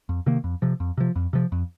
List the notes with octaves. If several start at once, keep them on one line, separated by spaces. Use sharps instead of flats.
F2
C3 D#3 A#3
F2
C3 F3
F2
C3 F3
F2
C3 F3
F2